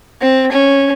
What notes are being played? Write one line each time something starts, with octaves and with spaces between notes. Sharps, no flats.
C4
C#4